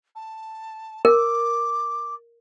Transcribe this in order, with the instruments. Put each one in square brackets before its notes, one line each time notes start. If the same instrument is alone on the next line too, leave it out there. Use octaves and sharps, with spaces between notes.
[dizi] A5
[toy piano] A#4 [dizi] D6